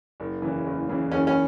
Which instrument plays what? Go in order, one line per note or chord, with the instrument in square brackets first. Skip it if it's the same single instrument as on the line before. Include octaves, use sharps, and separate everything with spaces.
[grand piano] F#1
E2 C#3 E3
F#1
E2 C#3 E3
[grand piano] F#1 [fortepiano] C#4
[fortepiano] C#4